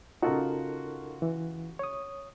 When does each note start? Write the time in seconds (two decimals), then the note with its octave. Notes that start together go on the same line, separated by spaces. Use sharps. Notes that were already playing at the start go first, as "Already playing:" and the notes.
0.22 C#3 D#4 F4 F#4 A4 A#4
1.22 E3
1.79 C#5 D#6